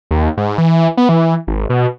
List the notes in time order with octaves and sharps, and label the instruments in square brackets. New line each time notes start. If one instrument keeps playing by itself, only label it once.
[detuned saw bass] D#2
G#2
E3
B3
E3
G#1
B2